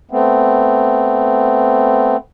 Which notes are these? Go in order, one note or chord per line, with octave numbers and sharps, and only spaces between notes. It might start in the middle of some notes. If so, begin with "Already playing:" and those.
A3 B3 C4